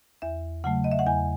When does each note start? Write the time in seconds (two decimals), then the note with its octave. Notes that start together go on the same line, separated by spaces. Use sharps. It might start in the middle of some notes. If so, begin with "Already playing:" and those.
0.22 E2 E5
0.64 C#3 F#3 A3 F#5
0.84 D#5
0.91 E5
0.99 F#5
1.07 E2 G#5